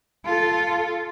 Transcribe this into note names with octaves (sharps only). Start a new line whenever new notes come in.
F4 A4